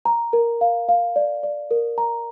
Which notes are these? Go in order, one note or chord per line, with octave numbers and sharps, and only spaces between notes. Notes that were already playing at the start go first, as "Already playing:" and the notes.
A#5
A#4
F5
F5
D5
D5
A#4
A#5